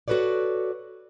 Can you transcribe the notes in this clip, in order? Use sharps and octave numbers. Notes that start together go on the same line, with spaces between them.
F#4 A4 B4 C#5 D5